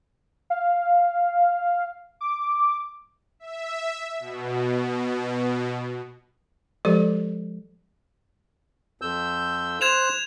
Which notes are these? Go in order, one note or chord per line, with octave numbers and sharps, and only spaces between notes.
F5
D6
E5
B2
F3 G#3 G4 A4 D5
F2 E6 G6
C5 F#6 G#6 E7 F7